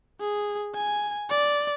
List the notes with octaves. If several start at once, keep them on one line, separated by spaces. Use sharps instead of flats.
G#4
G#5
D5